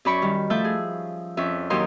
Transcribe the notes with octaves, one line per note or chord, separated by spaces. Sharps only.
F#2 C#4 D5 B5 C#6
D#3 G3
F3 A3 E5 A5 G6
G#4
F2 C#4 E5
D#2 F#3 G4 A#4 D#5 C6